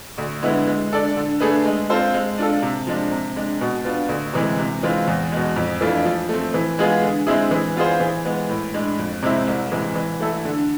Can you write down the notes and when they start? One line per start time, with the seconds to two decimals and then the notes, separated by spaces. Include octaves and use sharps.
0.18 D2
0.43 D3 G#3 B3 E4
0.67 G#3
0.92 D4 A4 D5
1.16 D3
1.40 A3 D4 G#4 B4
1.65 G#3
1.89 C4 F4 A4 C5
2.14 G#3
2.38 D4 F4 A4
2.62 C3
2.87 F3 G#3 D4
3.11 C3
3.36 G#3 D4
3.61 B2
3.85 B3 D4 F4
4.09 D2
4.33 C3 E3 G#3
4.58 C3
4.83 E3 G#3 C4 F4
5.07 E2
5.32 B2 G#3
5.56 F2
5.81 E3 A3 D4 F4
6.05 F3
6.29 A3 C4
6.54 E3
6.79 G#3 B3 F4 G#4
7.02 D3
7.27 G#3 C4 E4 G#4
7.51 E3
7.76 B3 F4 G#4 C5
8.00 E3
8.25 G#3 B3
8.49 A2
8.74 G#3 D4
8.99 F2
9.22 C3 G#3 C4 E4
9.48 C2
9.72 C3 E3 G#3
9.95 E3
10.20 A3 E4 A4
10.45 D3